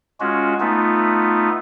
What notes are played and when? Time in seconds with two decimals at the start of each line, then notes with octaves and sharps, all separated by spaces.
0.20 G#3 C#4 F4 F#4
0.60 A3 B3 D#4 F4